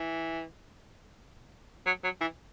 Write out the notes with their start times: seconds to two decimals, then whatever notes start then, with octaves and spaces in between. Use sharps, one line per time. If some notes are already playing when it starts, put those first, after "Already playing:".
Already playing: E3
1.86 F#3
2.04 F#3
2.21 E3